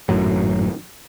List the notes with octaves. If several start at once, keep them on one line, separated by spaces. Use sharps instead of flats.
G#1 F#2 A2 F#3